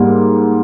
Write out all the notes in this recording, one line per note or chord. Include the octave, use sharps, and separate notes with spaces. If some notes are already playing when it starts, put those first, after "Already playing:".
Already playing: G#2 G3 A#3